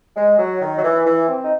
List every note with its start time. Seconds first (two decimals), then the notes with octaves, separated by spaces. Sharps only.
0.16 G#3
0.39 F#3
0.61 D#3
0.75 F#3
0.84 E3
1.05 E3
1.28 C4
1.44 D#4